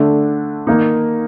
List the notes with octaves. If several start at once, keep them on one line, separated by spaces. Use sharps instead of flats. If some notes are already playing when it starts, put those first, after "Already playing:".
Already playing: D3 A3 D4
D#3 A#3 D#4